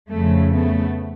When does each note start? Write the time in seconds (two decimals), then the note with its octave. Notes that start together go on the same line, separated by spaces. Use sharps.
0.11 F2 C#3 F3 A3
0.54 A3 B3